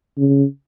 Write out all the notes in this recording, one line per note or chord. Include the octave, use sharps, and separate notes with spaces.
C#3